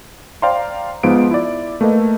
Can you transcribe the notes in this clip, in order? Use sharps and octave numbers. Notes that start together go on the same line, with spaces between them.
C5 D5 F5 G5 A#5 C6
G#2 F3 B3 F4 D7
E4 D5
A3 A#3 A4 B4 D#5